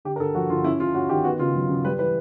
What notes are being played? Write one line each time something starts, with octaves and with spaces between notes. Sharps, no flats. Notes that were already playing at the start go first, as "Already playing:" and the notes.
D3 G4
A#4
D3 A4
F3 F#4
D3 F4
C#4 E4
C#4 F4
C#4 F#4
D#3 G4
B3 F#4
C#3 F4
F#3
C#3
G3 B4
E3 B4